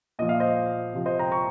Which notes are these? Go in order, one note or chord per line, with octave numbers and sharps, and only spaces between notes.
A#2 F3 D#5
F5
C5 D#5
C3 F3
C5 D#5
G5 A#5
A#5 C#6